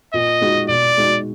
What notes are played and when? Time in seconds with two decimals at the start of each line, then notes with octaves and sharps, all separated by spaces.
0.14 A#2 D#5
0.41 G#3 D#4 F#4
0.69 B2 D5
0.97 G#3 D#4 F#4